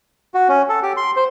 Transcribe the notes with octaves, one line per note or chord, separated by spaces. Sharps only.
F#4
C#4
A4
G4
C6
C5